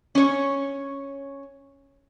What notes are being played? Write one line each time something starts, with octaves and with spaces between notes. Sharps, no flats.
C#4 C#5